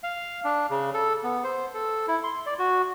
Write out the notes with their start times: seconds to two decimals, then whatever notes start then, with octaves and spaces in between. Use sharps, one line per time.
0.03 F5
0.44 D4
0.70 C#3
0.94 A4
1.24 B3
1.44 C5
1.75 A4
2.08 E4
2.23 C6
2.46 D5
2.59 F#4